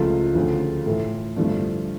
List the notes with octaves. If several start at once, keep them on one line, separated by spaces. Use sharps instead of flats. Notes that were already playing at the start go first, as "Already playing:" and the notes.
Already playing: C#2 C#3 F3 A3 F4
D2 C#3 F3
A2 E3 A3
G2 D3 F3 A3